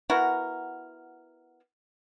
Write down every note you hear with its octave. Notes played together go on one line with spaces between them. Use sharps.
B3 E4 F#4 A#4